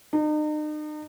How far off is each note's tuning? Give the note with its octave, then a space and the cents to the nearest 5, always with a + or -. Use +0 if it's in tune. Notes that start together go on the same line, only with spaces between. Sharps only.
D#4 -40